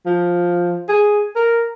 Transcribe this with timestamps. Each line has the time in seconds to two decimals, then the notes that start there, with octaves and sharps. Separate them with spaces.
0.06 F3
0.89 G#4
1.35 A#4